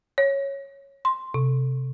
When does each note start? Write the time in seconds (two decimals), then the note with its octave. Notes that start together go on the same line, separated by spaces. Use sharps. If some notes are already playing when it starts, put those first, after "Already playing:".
0.18 C#5
1.05 C6
1.34 C3